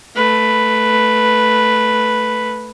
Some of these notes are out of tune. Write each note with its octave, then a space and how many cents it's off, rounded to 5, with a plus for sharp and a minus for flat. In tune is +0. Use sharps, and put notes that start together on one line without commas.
A3 +0 B4 +0